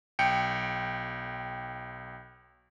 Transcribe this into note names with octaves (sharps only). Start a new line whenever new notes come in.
B1 G5 C#7